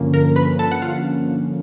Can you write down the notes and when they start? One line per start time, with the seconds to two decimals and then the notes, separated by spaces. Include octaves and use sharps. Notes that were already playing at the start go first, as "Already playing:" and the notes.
Already playing: G2 D3 F3 A#3 C#4
0.14 A#4 A#5
0.36 B4 B5
0.59 A4 A5
0.72 F#5
0.82 F4 F5